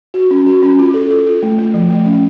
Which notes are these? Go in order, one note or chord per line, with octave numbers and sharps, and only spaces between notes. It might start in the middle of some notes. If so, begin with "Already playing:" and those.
F#4
C#4
F#4
C#4
F4
A4
A4
F4
A3
A3
F3
A3
C#4